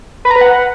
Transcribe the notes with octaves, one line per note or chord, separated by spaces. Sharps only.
B4
A#5
B4
F#5